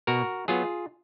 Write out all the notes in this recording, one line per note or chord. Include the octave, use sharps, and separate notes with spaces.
B2 F#4 A#4
F#3 B3 F4 G#4